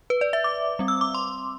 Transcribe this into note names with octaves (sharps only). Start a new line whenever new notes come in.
B4
D5
E5
D6
G3 C4
E6
D6
C6